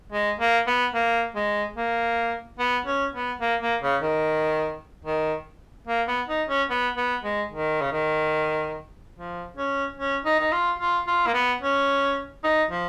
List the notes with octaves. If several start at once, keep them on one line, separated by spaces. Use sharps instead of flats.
G#3
A#3
B3
A#3
G#3
A#3
B3
C#4
B3
A#3
A#3
C#3
D#3
D#3
A#3
B3
D#4
C#4
B3
B3
G#3
D#3
C#3
D#3
F3
C#4
C#4
D#4
D#4
F4
F4
F4
A#3
B3
C#4
D#4
F3